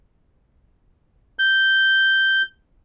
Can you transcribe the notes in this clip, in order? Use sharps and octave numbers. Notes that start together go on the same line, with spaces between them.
G6